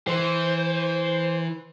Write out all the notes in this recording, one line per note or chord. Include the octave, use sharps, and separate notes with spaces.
E3 C5